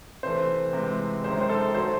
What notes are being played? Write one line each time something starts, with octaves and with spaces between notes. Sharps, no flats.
C3 E3 A3 C5
C3 E3 G#3
F#2 D#3 G#3 C5
C5
A4
F#3 A3 C5